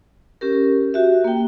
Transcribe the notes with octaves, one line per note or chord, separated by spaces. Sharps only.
C#4 G4 A#4
F#4 G4 E5
A#3 G5